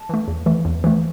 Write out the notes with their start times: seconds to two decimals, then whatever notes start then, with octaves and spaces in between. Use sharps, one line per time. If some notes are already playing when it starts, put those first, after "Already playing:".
Already playing: A5
0.09 E3 A3
0.28 E2
0.46 E3 A3
0.65 E2
0.84 E3 A3